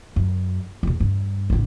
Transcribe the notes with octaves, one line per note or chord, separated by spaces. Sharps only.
F#2
E2 B2
G2
A1 D3